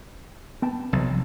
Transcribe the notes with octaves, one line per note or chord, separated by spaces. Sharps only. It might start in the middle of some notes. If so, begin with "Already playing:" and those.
B3 G5 A5
B1 C3 F3